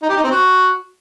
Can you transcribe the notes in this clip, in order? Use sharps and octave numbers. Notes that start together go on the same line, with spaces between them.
D#4
G4
D#4
C4
F#4